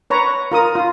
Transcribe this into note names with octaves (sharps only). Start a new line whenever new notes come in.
B4 C#5 A#5
F4 A#4 D#6
F4